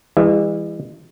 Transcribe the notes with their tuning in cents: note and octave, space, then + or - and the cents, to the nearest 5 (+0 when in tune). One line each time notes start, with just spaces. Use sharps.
E3 +0 G#3 -45 E5 +15